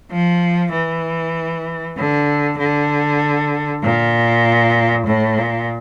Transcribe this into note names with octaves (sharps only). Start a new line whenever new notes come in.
F3
E3
D3
D3
A#2
A2
A#2